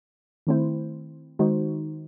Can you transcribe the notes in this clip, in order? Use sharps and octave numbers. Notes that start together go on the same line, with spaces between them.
D#3 A3 C4 E4 C5
D#3 G#3 D#4 F#4 C5